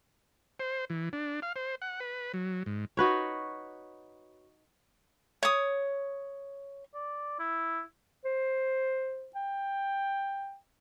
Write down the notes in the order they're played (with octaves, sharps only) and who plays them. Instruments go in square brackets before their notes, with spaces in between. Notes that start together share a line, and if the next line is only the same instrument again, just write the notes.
[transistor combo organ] C5
E3
D4
F5
C5
F#5
B4
F#3
G#2
[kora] D#4 F#4 B4 C#5
[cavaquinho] C#5 D#6
[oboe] D5
E4
[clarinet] C5
G5